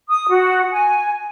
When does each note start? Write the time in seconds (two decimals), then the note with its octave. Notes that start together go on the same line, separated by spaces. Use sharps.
0.09 D#6
0.31 F#4
0.71 G#5